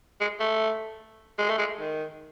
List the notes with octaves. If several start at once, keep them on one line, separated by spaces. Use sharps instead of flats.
G#3
A3
G#3
A3
G#3
D#3